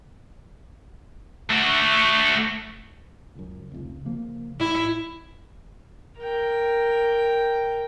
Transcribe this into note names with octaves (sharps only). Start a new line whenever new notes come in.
A3 F#4
C#2 F#2
F1 C#2
C#3 F3 A#3
A1 A2 E4
A#4 G5